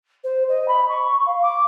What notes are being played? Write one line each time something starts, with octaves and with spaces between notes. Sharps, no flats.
C5
D#5
B5
C#6
F5
D6